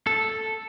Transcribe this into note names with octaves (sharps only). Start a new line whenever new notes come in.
A4